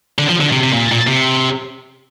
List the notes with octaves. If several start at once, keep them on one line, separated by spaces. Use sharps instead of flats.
D3
F3
D3
C3
C3
A#2
A#2
C3